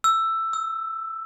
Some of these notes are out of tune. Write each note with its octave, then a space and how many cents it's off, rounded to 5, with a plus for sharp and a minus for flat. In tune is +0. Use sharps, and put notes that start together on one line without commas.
E6 +10
E6 -35